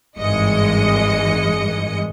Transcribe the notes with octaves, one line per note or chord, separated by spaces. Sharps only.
G#1 G2 E3 G#3 D#5 C#7